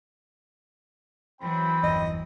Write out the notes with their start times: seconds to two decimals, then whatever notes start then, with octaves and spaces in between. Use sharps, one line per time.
1.42 E3 F#3 C4 G5 B5
1.83 G1 E2 D#5